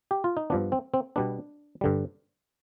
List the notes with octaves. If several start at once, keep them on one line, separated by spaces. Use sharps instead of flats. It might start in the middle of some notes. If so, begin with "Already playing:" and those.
G4
F4
D#4
G2 F3 B3 D4
C4
C4
B2 G3 B3 D4
G2 D3 G3